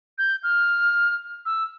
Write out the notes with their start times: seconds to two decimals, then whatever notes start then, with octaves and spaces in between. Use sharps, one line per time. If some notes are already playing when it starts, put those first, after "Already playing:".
0.18 G6
0.43 F6
1.46 E6